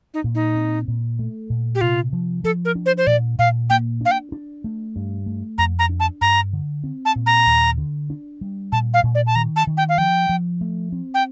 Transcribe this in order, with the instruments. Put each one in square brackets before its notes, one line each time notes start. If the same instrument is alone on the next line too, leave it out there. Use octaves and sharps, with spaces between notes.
[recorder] D#4
[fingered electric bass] A#2
[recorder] D#4
[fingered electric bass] C4
A#2
A3
A#2
[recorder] G4
[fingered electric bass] C3 [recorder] F4
[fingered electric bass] F3
[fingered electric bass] F3 [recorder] A4
[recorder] A#4
[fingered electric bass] D4
[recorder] C5
C5
[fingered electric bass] A#2 [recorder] D5
[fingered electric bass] A#2 [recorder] F5
[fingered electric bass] A#3 [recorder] G5
[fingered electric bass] D4 [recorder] F5
[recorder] G5
[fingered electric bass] D4
A3
G2
A3
[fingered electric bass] F2 [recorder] A#5
[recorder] A#5
[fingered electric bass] D4
[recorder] A5
[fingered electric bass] G2 [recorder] A#5
[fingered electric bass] D3
C4
[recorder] A5
[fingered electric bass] A#2
[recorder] A#5
[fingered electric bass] D#2
D3
D4
G3
[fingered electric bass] A#2 [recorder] A5
[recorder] F5
[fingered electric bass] A#2
[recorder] D5
A5
[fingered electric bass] D#3 [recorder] A#5
[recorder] A5
[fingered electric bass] D#3
[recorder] G5
F5
[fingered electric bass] F3 [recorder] G5
[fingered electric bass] F3
A3
C4
[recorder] G5